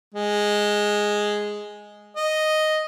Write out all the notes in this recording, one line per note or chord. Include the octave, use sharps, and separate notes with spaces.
G#3
D#5